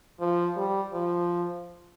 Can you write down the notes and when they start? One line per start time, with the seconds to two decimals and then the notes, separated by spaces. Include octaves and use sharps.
0.20 F3
0.56 G3
0.93 F3